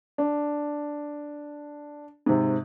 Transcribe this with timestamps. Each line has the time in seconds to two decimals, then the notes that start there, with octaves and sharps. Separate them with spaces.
0.18 D4
2.26 G#2 C3